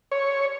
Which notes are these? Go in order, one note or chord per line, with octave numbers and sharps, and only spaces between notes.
C#5